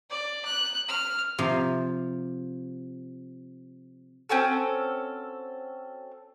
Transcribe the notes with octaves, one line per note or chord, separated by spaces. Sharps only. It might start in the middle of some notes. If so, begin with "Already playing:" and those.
D5
F#6
F6
C3 F3 F5 A#5
C4 C#4 F#4 A4